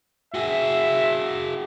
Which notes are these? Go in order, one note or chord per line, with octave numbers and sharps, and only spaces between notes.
F#4 G#4 E5